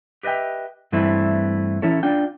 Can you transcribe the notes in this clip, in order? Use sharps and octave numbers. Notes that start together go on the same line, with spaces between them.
G4 B4 D#5 E5 G5
G2 E3 A3 C4 E4
E3 C#4 E4 A4 C#5
D4 F4 G5